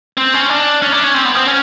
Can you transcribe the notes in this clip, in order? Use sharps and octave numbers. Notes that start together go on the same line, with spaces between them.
C4
C#4
D4
C#4
D4
C#4
C4
B3
C4
C#4